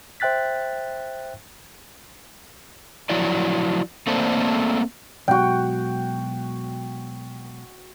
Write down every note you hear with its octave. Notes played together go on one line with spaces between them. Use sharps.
C5 E5 G5 F#6 A6 B6
F3 F#3 E4 D5
A3 A#3 C4 A4 C5 D5
B2 F#3 G#3 F#4 G5